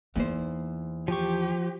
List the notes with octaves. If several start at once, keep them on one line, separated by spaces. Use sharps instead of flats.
E2 A#3 D#4 C5
F3 G4 C#6